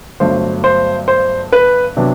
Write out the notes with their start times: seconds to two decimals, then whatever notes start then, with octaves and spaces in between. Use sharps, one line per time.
0.20 G1 G2 F#3 A3 C5
0.64 C5
1.08 C5
1.52 B4
1.97 C3 F#3 B3 D4